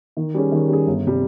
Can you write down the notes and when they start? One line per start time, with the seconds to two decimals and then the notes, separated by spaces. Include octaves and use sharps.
0.17 D#3
0.34 G3 C#4 G#4
0.52 D#3
0.69 G3 C#4 G#4
0.87 G1
1.06 C3 G3